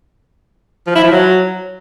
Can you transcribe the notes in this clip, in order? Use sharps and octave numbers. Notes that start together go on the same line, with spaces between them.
F3
E4
F3
F#3